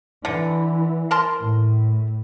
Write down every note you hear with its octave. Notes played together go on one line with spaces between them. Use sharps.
D3 E3
A#4 A5 C6
A2